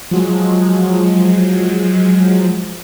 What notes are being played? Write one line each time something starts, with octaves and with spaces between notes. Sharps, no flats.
F3 F#3 G#3